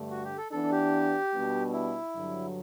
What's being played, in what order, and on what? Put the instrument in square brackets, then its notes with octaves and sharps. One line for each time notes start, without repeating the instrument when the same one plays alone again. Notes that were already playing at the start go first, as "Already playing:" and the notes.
Already playing: [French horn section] G2 D3 A3
[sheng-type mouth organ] F#4
G4
A4
[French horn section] E3 B3 D4 [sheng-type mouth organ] A4
[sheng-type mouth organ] G4
[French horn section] B2 G3 B3 D4
[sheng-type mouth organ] E4
[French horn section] G2 D3 F#3